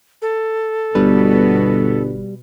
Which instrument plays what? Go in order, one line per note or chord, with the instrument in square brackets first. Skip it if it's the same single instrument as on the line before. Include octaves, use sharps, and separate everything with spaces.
[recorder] A4
[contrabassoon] G1 [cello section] B2 B3 [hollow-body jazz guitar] G3 B4